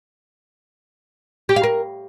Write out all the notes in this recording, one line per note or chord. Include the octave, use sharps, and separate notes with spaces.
G4
F5
A#4